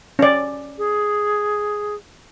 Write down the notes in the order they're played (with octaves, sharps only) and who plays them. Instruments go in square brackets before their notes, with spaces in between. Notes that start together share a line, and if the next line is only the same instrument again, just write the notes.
[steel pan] C#4 D5
[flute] G#4